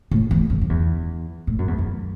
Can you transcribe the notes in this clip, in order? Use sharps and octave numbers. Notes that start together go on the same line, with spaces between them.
A2
E2
F#2
F#2
E2
A2
F#2
E2
F#2